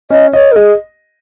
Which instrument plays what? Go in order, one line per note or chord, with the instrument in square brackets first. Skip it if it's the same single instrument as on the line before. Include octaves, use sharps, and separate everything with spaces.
[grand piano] C#4 [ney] D#5
[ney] C#5 [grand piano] D#5
[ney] A#4
[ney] G#4 [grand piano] D#5